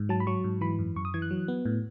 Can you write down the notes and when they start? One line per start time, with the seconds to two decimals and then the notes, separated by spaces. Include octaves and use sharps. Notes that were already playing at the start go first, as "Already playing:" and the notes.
Already playing: G#2
0.09 F#3 A5
0.20 B5
0.27 F#3 C#6
0.44 G#2
0.61 E3 B5
0.79 F#2
0.96 F#2 C#6
1.05 D#6
1.14 E3 G#6
1.22 F#6
1.31 F#3
1.48 B3
1.65 A2